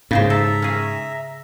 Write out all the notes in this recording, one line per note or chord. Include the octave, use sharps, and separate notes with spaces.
G#2 C#3 G4 C5
A4 E5 A#5
C#4 G#4